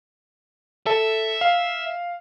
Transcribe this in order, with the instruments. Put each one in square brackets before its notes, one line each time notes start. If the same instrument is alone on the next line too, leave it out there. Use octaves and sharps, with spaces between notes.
[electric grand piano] A4 [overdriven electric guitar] E5
[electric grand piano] F5